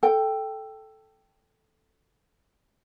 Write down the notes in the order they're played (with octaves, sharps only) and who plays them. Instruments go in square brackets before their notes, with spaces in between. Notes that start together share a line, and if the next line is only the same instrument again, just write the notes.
[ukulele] A4 G5